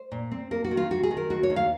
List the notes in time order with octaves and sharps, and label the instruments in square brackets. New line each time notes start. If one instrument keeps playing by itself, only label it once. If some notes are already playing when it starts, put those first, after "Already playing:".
Already playing: [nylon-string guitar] C5
A#2
C4
A#3 A#4
F#4
D#3
F4
D#3 F#4
G#4
D#3
A#4
D#2 F#4
C#5
D#2
F5